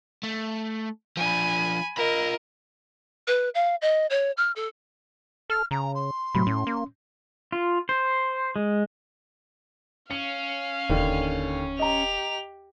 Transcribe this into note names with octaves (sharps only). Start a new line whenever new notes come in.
A3
F3 D4 G#5 B5
F4 A#4 D#5 B5
B4
F5
D#5
C#5
F6
A4
A4 F6
C#3 A#5
C6
A2 C3 F#3 B5
A2 C#4
A#3
F4
C5
G#3
C#4 F5 C#7
E1 D#2 D3
G4 D#5 A#5 F7